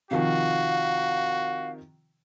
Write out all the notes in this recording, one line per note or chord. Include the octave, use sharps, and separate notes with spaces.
C3 D#3 F3 F#4 F5